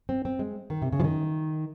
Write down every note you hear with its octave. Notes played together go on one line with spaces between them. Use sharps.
C4
C4
G#3
D#3
C3
C#3
F3
D#3